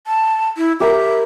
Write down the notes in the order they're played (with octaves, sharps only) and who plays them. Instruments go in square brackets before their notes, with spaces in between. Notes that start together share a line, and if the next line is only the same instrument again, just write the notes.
[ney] A5
E4
[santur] G4 A#4 B5 [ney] E5